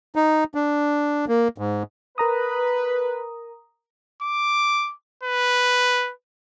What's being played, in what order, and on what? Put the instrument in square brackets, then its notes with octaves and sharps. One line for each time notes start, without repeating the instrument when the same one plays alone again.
[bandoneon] D#4
D4
A#3
G#2
[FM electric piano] A#4 A#5 D#6 [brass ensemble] B4
[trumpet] D6
B4